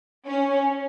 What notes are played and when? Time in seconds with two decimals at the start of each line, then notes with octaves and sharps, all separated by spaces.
0.26 C#4